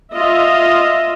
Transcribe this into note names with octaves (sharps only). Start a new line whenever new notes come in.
F4 D#5 E5